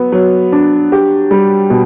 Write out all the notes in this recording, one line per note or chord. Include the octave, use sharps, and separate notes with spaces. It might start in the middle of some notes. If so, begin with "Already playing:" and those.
Already playing: F#3 B3
F#3
D4
G4
G3
B2